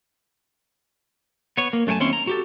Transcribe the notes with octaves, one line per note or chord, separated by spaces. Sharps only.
B3 C#5
A#3
F#2 A3 F4 A#4 G#5 A5
D#2 C4 C#4 E4 C#5 C6
A#5
F#4 G4 A4